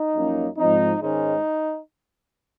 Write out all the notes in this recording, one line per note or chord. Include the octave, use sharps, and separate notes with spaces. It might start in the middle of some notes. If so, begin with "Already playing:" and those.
Already playing: D#4
F#2 F3 A#3 C#4
G#2 F3 C4 D#4
G#2 D#3 G#3 C#4 D#4